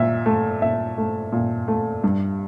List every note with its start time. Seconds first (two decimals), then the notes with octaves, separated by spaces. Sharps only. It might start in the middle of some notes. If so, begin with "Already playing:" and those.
Already playing: A#2 E5
0.26 A3
0.62 A#2 E5
0.98 A3
1.32 A#2
1.68 A3
2.04 G2